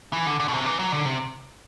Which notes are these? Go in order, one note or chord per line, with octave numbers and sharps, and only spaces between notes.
E3
D3
D3
B2
C3
E3
F#3
D3
C3